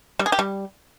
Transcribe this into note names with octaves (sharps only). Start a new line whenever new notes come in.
G3
G#4
G4
G3